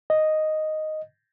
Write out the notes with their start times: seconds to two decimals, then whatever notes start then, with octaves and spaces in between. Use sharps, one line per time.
0.10 D#5